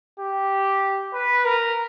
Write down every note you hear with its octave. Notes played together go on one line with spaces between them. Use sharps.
G4
B4
A#4